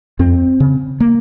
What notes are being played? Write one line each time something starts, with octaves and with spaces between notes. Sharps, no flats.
F2 C4
C#3
A#3